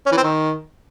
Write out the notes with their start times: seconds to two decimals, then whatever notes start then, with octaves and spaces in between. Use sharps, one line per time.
0.06 C#4
0.12 E3
0.17 C4
0.23 D#3